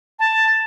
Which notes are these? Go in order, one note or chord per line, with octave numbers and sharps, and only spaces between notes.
A5